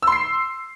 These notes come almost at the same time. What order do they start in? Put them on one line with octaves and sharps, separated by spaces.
E6 C6 C7